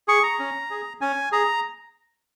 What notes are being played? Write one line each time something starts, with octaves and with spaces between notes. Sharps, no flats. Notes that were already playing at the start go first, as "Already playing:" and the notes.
G#4 C#6
A#5
C#4
G#4
C#4 G#5
G#4 A#5